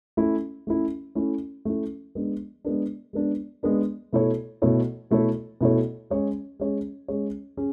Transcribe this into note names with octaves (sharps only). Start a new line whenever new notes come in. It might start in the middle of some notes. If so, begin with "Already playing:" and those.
A3 C#4 E4
A3 C#4 E4
A3 C#4 E4
A3 C#4 E4
G#3 B3 D4
G#3 B3 D4
G#3 B3 D4
G#3 B3 D4
B2 A3 E4 A4 C#5
B2 A3 E4 A4 C#5
B2 A3 E4 A4 C#5
B2 A3 E4 A4 C#5
G#3 C#4 G#4 C#5
G#3 C#4 G#4 C#5
G#3 C#4 G#4 C#5
C#4 G#4